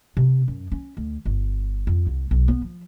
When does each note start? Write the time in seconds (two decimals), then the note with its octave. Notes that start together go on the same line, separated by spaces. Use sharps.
0.17 C3
0.48 F#2
0.72 C#4
0.97 D2
1.25 G1
1.87 F2
2.07 C2
2.31 B1
2.48 B3
2.61 F3